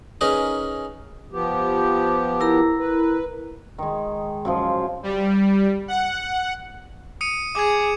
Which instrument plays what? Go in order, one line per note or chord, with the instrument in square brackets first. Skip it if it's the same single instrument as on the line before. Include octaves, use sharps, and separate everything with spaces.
[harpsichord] C#4 D#4 G#4 A#4 B4
[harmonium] F3 B3 G4
[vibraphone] E4 A#4 A#5
[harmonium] B4
[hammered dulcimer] D#3 G#3
F#2 C#3 F3
[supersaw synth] G3
F#5
[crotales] D#6 C#7 D#7
[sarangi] G#4 [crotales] D6 G#6